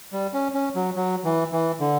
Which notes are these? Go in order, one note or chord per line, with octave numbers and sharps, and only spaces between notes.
G3
C#4
C#4
F#3
F#3
E3
E3
D3